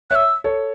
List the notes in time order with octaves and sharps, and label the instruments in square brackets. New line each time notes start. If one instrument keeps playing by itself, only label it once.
[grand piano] C#5 E5 [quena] E6 F#6
[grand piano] A4 C#5